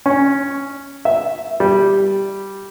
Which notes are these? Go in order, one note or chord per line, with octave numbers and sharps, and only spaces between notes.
C#4
E5
G3